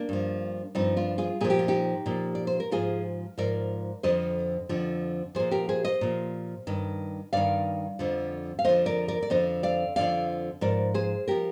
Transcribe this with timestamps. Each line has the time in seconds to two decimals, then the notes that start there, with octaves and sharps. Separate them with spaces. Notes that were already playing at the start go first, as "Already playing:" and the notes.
Already playing: A#3 D4
0.09 G2 F3
0.75 G2 F3 C4 D#4
0.97 D4 F4
1.18 F4 G#4
1.41 A#2 G#4
1.44 F3
1.50 G4
1.59 F4
1.68 D#4 G4
2.06 A#2 F3
2.35 D5
2.47 C5
2.60 A#4
2.71 G#2 F3 F4 G#4
3.38 G#2 F3 A#4 D5
4.03 F2 D3 F3 C5 D#5
4.69 F2 D3 F3
5.35 A#2 F3 G#4 C5
5.51 G4 A#4
5.69 G#4 C5
5.84 C5 D#5
6.01 A#2 F3
6.67 G2 D#3
7.33 G2 D#3 D5 F5
7.99 F2 D3 F3
8.59 F5
8.64 F2 D3 F3 C5 D#5
8.86 A#4 D5
9.08 A#4 D5
9.22 D5
9.30 F2 D3 F3 C5 D#5
9.63 D5 F5
9.96 F2 D3 F3 D5 F5
10.61 G#2 F3 A#4 D5
10.94 G#4 C5
11.28 F3 G4 A#4